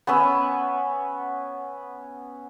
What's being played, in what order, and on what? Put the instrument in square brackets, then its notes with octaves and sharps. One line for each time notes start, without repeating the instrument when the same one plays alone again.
[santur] B3 C#4 B4 E6